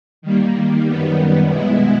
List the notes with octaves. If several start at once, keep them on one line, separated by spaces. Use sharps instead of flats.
D#3 G3 A#3
F#2 D#3 G3 B3
B2 G#3 B3 E4